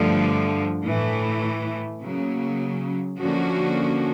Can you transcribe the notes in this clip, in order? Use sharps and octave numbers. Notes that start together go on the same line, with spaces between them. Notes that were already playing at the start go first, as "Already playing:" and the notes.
Already playing: G2 D3 F3 A3
A2 E3 A3
C#3 F#3 A#3
D3 F3 A#3 C#4 F#4